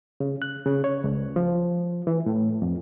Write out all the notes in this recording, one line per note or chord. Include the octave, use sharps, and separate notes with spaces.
C#3
F#6
C#3
C#5
C#2
F3
E3
A2
F2